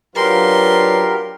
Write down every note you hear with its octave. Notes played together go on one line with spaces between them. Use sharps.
F#3 D4 F4 G4 A#4 B4 C6